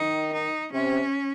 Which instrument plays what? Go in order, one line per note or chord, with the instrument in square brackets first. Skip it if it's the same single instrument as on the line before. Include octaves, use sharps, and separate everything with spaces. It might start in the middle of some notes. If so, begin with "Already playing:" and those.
Already playing: [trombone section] D#3 [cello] D#4
[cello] D#4
[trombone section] C3 [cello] C#4